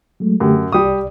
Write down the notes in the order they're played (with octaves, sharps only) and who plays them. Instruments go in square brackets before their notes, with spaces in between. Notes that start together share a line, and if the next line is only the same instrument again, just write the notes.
[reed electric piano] F#3 G#3 A3
[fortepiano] F#2 [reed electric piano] D3 A3 G4
[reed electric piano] C2 D5 [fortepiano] G3 D#6